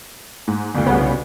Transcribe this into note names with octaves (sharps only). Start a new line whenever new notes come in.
G#2
G1 D2
C2 C#3 B3